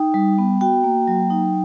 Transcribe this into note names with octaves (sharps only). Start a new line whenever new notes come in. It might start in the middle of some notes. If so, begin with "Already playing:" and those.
Already playing: D#4 G5
G3
B3
F#4 G5
A#3
F#3
D#4